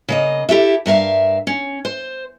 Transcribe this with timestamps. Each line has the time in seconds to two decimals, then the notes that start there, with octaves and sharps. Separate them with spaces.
0.08 C#3 A#3 D#5
0.49 E4 G4 A4 E5
0.86 G2 A#4 E5 F5
1.47 C#4
1.85 C5